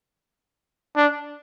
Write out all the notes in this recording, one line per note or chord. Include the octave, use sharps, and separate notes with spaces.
D4